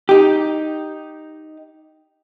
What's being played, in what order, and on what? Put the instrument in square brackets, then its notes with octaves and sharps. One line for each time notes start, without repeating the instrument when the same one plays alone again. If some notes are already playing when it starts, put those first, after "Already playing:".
[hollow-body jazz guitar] D#4 G4